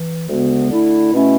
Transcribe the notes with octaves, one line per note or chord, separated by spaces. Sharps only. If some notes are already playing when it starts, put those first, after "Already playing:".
Already playing: E3
D2 C#3 G#3 B3 F#4
D3 A3 E4
B2 A3 C#4 E4